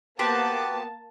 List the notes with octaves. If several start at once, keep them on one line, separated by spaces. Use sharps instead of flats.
A#3 B3 F#4 G4 C5 A5 D6